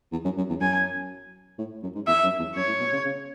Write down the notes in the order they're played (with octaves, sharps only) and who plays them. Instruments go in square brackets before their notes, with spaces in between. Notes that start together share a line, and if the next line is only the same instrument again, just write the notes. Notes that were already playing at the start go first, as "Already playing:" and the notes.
[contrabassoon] E2
F#2
F#2
E2
[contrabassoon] F#2 [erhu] G#5
[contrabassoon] A2
F#2
G#2
[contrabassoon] E2 [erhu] E5
[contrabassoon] F#2
E2
[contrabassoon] F#2 [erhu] C#5
[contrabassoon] A2
B2
C#3
C#3